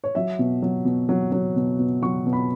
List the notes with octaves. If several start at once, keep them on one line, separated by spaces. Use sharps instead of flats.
C#5
F#3 E5
B2
F#3
B2
F#3
F#3
B2
B2
F#3 C#6
B2
B5